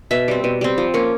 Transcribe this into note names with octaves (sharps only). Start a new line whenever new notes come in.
B2 E5
G3 C4
B2
G3 C4
F3
A#3 C#4